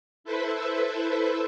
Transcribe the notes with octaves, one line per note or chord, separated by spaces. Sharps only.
E4 A4 B4 C5 E5